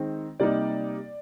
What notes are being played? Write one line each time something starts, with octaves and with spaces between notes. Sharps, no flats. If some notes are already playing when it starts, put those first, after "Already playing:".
Already playing: D#3 G#3 C4 D#4
C3 G3 A#3 D#4 D5